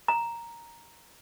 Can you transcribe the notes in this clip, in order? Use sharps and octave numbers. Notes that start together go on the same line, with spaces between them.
A#5